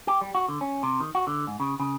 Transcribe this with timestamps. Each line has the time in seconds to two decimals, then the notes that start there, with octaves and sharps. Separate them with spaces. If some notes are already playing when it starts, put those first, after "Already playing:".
0.07 G4
0.21 G3
0.35 F#4
0.48 D3
0.61 C#4
0.83 C3
1.00 D#3
1.15 F#4
1.27 D3
1.47 G#2
1.60 C#3
1.80 C#3